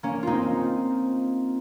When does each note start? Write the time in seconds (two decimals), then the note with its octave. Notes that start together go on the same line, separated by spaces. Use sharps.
0.03 A#3 C#4
0.23 C4 D#4 F4